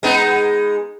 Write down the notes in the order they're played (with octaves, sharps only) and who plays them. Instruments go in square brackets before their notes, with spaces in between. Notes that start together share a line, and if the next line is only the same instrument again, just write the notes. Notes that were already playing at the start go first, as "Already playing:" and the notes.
[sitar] G#3 B3 D#4